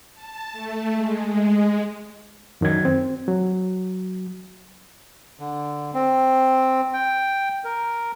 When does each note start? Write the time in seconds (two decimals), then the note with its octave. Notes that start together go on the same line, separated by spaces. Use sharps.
0.15 A5
0.52 A3
0.94 G#3
1.24 G#3
2.61 F#2 D#3 F#3 G#6
2.85 C4
3.28 F#3
5.39 D3
5.94 C4
6.93 G5
7.64 A#4